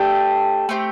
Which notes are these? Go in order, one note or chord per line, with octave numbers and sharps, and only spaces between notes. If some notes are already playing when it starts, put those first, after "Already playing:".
Already playing: A3 D4 G4 A4 G5
A3 C4 G4